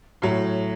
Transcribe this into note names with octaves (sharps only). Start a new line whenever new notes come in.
A2 F#3